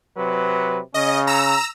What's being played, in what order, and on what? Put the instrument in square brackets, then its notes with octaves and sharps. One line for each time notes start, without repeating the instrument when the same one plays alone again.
[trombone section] C3 F#3 B4
[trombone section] C#3 C#4 [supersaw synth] D#5
[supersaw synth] A#5 E6